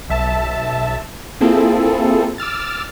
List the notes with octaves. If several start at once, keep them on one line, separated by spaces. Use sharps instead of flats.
B1 E5 A5
A#3 C4 E4 F4 G#4 A4
D6 E6 F6 A6